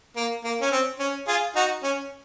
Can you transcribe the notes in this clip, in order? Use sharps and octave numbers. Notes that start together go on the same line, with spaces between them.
A#3
A#3
C#4
C4
C#4
F4 G#4
D#4 F#4
C#4